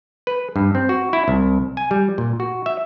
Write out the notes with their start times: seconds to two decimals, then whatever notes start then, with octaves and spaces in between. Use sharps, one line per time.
0.27 B4
0.56 G2
0.75 C4
0.89 F#4
1.13 E4
1.28 C2
1.77 G#5
1.91 G3
2.18 A#2
2.40 F#4
2.66 E5